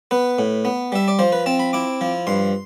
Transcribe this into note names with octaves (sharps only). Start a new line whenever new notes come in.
B3 B4
A2
B3
G3 E5
D5
F3 C5
B4
C4 A5
B5
E4 D6
F3
G2 C6